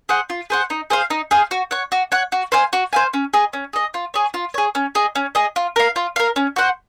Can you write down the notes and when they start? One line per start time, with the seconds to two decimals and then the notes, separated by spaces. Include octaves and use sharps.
0.09 G#4 C5 F#5
0.30 F4
0.50 G#4 C5 F#5
0.70 D#4
0.90 G#4 C5 F5
1.10 D#4
1.31 G#4 C5 F5
1.51 F#4
1.71 C#5 F#5
1.92 F#4
2.12 C#5 F#5
2.32 F#4
2.52 C5 F5 G#5
2.73 F#4
2.93 C5 F5 G#5
3.14 C#4
3.34 G#4 D#5
3.53 C#4
3.73 G#4 D#5
3.94 F4
4.14 G#4 C#5
4.34 F4
4.54 G#4 C#5
4.75 C#4
4.95 G#4 D#5
5.15 C#4
5.35 G#4 D#5
5.56 F4
5.76 A#4 F5
5.96 F4
6.16 A#4 F5
6.36 C#4
6.56 F#4 C5 F#5